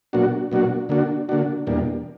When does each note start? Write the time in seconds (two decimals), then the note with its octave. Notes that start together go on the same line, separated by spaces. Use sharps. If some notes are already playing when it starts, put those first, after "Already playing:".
0.13 B2 F#3 A#3 D4 F#4
0.52 B2 F#3 A#3 D4 F#4
0.89 D3 A#3 D4 F#4
1.29 D3 A#3 D4 F#4
1.67 E2 B2 G3 A#3 D4